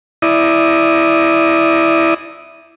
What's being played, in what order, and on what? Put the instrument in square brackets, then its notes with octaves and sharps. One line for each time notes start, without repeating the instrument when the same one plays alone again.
[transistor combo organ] E4 D5 D#6